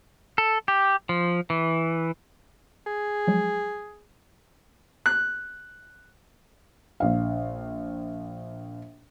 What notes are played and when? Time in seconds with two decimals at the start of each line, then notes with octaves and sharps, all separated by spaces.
0.38 A4
0.68 G4
1.09 F3
1.50 E3
2.87 G#4
3.27 F3 F#3 G#3
5.06 F#6
7.00 A#1 F5